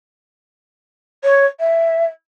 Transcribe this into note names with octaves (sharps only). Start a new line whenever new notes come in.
C#5
E5